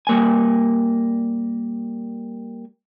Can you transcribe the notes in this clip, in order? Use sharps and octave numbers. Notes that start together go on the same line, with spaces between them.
G3 A#3 G#5